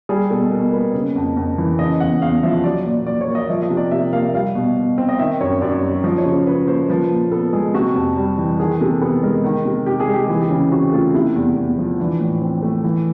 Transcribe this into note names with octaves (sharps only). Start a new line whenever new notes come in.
G3 G#4
B2 A4
B2 A#4
A#3 B4
C#3
F2
F2
E3
C#3 D#5
E2 F#5
E2 F5
F3 E5
F#3 D5
A#2 D5
A#2 D5
C#5
A#3
D#5
F3 E5
D#5
C3
D5
C3 E5
A#3 F5
E5
G3 F5
B2
B2
C4
D#5
D#3 E5
F#2 C#5
F#2 D5
F#3
F3 D#5
C#5
C#3
C5
C#3 B4
A#3 C5
F3 B4
A#2
B3 A4
G#3 G#4
C3 F#4
F2
G3
E3
D#3 G#4
C3 A4
B3 A4
G#3 A#4
D#3
C3
C3 G4
G#4
G#3
G4
E3 G#4
G4
C#3
C4 F#4
A3 F4
C3 E4
E2
E2
F3
E3 D4
A2
C4
A3
E3